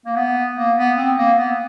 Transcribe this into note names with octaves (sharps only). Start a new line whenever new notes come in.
A#3
B3
A#3
B3
C4
A#3
B3